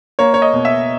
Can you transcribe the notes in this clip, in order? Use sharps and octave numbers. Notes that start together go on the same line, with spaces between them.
A#3 C#5
C#5
D#5
B2
E5